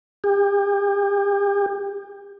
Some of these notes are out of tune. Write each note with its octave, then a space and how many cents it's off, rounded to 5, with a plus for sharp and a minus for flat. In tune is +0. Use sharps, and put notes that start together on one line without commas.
G4 +40